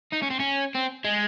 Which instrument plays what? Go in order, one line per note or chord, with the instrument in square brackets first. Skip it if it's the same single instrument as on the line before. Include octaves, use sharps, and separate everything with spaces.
[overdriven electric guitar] D#4
C#4
C4
C#4
C4
G#3